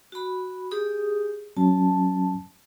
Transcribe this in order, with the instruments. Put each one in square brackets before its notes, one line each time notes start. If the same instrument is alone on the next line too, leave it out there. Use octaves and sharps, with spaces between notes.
[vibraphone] F#4 B5
G4 G#4 D#6
[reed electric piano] F#3 C#4 [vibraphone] A5